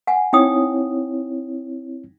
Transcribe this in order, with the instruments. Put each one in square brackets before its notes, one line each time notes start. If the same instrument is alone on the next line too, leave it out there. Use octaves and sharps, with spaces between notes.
[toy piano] F#5 G#5
[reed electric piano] C4 E4 C#5 [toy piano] D#4 G5 D#6